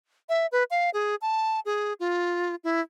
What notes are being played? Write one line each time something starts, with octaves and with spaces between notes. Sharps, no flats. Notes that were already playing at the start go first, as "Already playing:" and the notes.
E5
B4
F5
G#4
A5
G#4
F4
E4